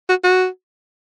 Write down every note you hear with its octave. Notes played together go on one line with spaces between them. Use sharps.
F#4
F#4